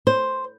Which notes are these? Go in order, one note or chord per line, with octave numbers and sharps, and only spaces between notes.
C5